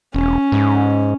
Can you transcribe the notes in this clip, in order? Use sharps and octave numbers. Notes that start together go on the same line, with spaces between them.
E1 C#4
G#2